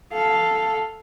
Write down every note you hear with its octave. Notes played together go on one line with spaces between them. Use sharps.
A4 F5